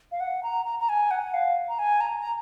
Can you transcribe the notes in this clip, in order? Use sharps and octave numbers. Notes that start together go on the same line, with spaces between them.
F5
F#5
A#5
A#5
A#5
G#5
F#5
F5
A#5
G#5
A#5
A#5